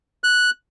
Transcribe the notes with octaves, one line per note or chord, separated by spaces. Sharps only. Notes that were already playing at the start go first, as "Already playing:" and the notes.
F#6